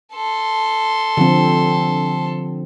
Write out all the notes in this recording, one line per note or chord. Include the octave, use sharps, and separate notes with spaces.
A4 C6
D3 F3 C4